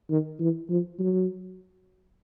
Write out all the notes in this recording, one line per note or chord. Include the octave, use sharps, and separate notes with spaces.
D#3
E3
F3
F#3